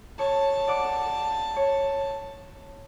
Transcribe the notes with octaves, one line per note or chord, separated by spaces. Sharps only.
C#5 A5 C#6
D5 F#5 D6
C#5